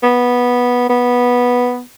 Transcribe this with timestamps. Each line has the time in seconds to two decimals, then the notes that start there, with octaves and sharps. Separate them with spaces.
0.03 B3
0.89 B3